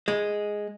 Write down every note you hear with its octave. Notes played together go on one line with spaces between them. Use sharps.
G#3